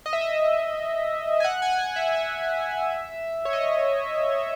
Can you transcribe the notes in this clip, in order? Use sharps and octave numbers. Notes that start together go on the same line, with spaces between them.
D#5
E5
D#5
G#5
F#5
G#5
G#5
F#5
E5
E5
C#5
D#5